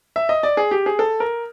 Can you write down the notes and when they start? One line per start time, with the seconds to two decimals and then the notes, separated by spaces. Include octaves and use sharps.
0.16 E5
0.29 D#5
0.43 D5
0.57 G#4
0.71 G4
0.86 G#4
0.99 A4
1.20 A#4